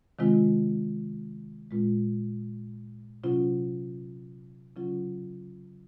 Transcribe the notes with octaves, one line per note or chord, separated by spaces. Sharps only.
C3 D#3 G#3 C4 F4
A#2 G#3 C4 F4
C3 F#3 C#4 F4
C#3 F#3 C#4 F4